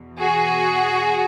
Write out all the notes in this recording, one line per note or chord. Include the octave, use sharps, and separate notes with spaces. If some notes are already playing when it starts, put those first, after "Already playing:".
Already playing: E2 B2
F#4 G#4